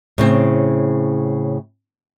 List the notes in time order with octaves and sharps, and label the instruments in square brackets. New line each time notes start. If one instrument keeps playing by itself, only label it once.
[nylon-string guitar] A2 C#3 C4